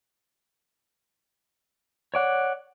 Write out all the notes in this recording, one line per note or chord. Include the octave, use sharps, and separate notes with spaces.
C#5 D5 F#5